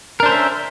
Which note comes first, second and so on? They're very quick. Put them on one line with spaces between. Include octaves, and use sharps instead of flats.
A#4 D4 C5 C#4 E5